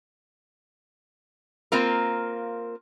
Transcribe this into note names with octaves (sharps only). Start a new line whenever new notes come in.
A#3 C4 F4 A#4